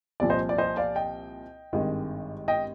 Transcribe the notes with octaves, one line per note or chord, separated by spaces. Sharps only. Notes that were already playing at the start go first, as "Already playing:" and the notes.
C2 A#2 F3 D5
C5 D#5
D5
C5 D#5
D5 F5
D#5 G5
G#1 G2 D#3 G#3
D#5 G5